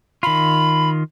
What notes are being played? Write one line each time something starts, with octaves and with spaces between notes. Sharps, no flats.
D#3 F4 B5